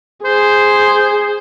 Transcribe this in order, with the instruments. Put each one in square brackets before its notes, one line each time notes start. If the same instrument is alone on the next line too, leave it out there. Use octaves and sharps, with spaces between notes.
[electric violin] G#4 [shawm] C5